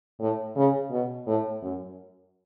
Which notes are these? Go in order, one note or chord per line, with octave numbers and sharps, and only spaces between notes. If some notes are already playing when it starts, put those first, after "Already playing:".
A2
C#3
B2
A2
F#2